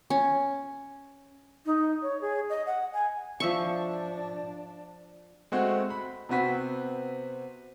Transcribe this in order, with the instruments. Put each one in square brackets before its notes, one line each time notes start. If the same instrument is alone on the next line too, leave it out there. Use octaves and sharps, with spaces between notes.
[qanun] C#4
[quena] D#4
C#5
G#4
D#5
F#5
G#5
[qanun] F3 E5 C#6 [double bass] D4
[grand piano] G#3 A3 C4 F#4
B5
C3 B3 C4 F#4 B4 B6